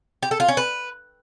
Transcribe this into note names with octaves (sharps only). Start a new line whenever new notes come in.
G4
A4
F4
C#4
B4